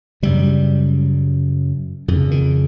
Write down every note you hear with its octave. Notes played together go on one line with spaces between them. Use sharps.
F#2 C#3 G3
F2 C#3 D3
D#3